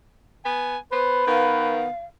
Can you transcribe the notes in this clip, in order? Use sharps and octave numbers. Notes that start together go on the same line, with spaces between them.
B3 G#5
B3 B4 C5
D#3 B3 F5